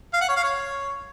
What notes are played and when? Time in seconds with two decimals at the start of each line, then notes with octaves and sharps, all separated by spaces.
0.14 F5
0.21 F#5
0.29 C#5
0.36 F5
0.44 C#5